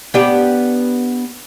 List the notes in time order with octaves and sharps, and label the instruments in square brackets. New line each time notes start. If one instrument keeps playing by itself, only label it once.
[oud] B3 D4 G4